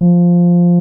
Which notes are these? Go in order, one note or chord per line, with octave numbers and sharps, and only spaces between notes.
F3